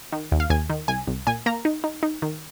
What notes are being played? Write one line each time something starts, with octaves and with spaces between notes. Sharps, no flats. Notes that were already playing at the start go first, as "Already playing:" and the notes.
D#3
D#2
F5
D#2 G#5
D#3
C2 G#5
C2
A#2 G#5
A#3 A#5
D#4
D#4
D#4
D#3